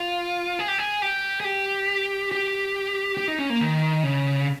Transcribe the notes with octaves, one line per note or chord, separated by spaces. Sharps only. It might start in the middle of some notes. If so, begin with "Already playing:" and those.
Already playing: F4
G#4
G4
G#4
G4
G#4
G4
G4
G4
D#4
C#4
A#3
D#3
C#3